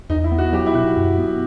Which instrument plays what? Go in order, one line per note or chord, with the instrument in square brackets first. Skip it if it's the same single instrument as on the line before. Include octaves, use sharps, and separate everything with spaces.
[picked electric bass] E2 [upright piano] D#4
[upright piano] E4
[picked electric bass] B3
[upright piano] F#4
[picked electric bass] F#3 [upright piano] G4
[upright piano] E4
[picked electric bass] B2 [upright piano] F#4
[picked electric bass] F#2
B3